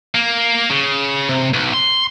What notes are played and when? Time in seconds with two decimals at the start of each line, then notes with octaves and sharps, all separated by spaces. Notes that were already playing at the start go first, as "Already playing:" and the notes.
0.15 A#3
0.71 C#3
1.29 C3
1.54 B1
1.74 C6